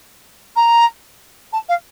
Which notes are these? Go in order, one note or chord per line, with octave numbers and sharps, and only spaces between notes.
A#5
A5
F5